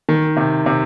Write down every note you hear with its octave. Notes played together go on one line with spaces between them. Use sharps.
D#3
C3
C3